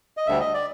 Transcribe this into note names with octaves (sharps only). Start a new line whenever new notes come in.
D#5
D2 D3 G3 E5
D#5
D5